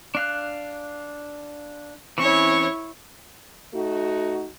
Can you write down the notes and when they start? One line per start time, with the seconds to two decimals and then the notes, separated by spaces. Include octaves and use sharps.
0.15 D4 F5 F#6
2.18 E3 C4 C#4 E4 C#5 C#6
3.74 A3 D#4 F#4